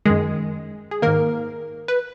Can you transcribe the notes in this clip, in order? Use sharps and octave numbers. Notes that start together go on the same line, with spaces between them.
F#2 D#3 G#3 G#4
G#4
G#2 D#3 A#3 A#4
B4